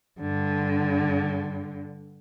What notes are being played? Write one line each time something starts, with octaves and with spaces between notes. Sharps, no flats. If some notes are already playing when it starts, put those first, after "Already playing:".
G2 D3